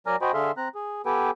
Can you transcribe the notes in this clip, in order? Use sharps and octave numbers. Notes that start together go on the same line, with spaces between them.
F#3 A#4 D5 G#5 A#5 F6
F#4 C5 D#5 G5 G#5 B5
D3 G#4 A4 E5 F5 C6
C4 A#5 F#6
G#4
B3 G4 A4 B4 G5 G#5